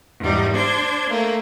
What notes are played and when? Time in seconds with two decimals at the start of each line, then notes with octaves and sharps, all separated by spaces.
0.19 E2 G#2 G3 D#4
0.53 D4 C5 C6 G#6
1.09 A3 A#3